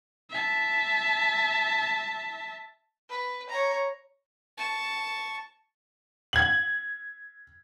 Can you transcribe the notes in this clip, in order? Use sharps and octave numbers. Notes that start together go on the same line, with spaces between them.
E5 A5
B4
C#5 A#5
A5 C#6
G#6 F#7